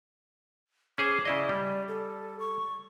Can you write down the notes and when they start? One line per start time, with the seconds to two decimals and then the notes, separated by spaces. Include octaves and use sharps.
0.98 C#4 G#4 C5 D6
1.25 C#3 E4 D5 D#5
1.49 G3
1.88 A4
2.40 C#6